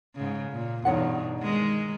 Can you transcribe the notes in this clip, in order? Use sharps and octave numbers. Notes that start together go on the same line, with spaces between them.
G#2 C#3
A#2
E2 G2 B2 D#4 C#5 F#5
D#3 G#3